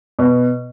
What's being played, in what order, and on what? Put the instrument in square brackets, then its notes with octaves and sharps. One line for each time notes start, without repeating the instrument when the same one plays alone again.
[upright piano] B2